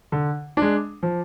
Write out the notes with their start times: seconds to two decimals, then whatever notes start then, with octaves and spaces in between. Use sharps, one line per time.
0.12 D3
0.57 G#3 D4
1.03 F3